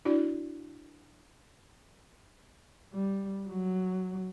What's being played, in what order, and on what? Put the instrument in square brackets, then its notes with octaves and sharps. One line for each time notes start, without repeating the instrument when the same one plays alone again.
[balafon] D4 E4 F#4 D5
[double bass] G3
F#3